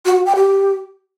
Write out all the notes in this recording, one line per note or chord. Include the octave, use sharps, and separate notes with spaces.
F#4
F#4
G5
G4